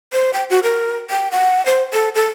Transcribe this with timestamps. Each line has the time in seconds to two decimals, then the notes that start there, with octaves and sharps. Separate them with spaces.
0.13 C5
0.33 G5
0.50 F#4
0.63 A#4
1.10 G5
1.31 F#5
1.66 C5
1.93 A4
2.15 A4